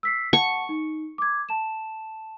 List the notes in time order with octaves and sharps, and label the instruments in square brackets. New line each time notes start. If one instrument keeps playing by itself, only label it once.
[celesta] E6 B6 C7
[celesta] F#5 A5 [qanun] C#6
[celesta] D#4
D6 G#6
A5 E7